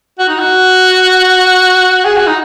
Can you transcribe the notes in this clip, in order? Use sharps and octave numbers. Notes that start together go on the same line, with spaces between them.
F#4
D#4
F#4
G#4
F#4
D#4